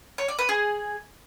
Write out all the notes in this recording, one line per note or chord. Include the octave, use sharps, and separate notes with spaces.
C#5
D5
B4
G#4